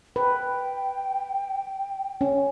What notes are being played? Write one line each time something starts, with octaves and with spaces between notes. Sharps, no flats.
B4 G5
C#4